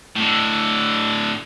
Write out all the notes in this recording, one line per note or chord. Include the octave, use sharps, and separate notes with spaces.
A2 D3